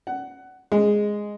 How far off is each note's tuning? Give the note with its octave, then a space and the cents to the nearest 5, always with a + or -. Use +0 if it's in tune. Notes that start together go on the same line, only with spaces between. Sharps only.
F#5 +15
G#3 +0